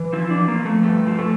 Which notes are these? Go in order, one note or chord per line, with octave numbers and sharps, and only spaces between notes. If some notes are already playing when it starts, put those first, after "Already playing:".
Already playing: E3
F3 E4
D4
F3
A#3
F3
A3
G2 A3
F3
A3